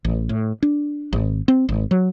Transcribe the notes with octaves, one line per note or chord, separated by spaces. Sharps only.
A1
A2
D4
G#1
C4
G#1
F#3